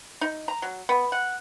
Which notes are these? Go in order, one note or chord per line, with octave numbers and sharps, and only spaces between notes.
D#4
A#5
F#3
B3
F#5